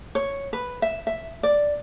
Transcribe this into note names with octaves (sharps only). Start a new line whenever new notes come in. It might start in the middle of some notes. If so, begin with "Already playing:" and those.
C#5
B4
E5
E5
D5